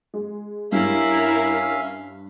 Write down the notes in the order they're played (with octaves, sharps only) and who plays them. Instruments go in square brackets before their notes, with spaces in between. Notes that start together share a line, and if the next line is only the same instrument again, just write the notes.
[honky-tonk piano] G#3
[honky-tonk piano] G2 G3 [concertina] C#4 E5 F5 [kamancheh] E4 A#4